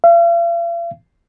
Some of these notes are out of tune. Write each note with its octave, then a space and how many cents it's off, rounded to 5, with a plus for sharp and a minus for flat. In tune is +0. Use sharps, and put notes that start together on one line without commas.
F5 -45